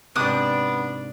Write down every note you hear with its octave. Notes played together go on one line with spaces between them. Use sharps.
G#2 C3 B3 D4 D6 D#6 F#6